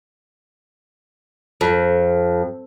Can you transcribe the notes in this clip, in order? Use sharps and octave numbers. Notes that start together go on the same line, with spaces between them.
F2